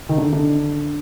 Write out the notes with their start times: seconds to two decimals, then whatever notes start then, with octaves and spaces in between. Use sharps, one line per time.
0.09 D#3
0.18 D3
0.33 D3